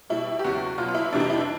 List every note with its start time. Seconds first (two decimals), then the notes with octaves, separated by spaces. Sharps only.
0.10 B2 G3 E4
0.39 G4
0.44 E2 C#3 F#3 F#4
0.78 B2 F4
0.82 F#3
0.88 F4
0.95 E4
1.13 F2 C3 E3 G3 D4
1.20 D#4
1.30 E4
1.38 D4